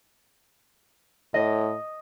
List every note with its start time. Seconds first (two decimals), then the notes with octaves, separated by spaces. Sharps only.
1.34 A2 D#5